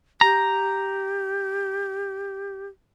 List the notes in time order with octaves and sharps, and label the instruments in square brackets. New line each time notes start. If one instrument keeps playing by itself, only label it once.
[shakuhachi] G4 [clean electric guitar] A#5